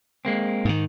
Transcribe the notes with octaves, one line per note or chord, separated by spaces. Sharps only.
G#3 A#3 C4
G#2 D#3